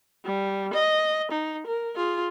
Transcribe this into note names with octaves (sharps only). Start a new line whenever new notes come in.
G3
D#5
D#4
A#4
F4 G#4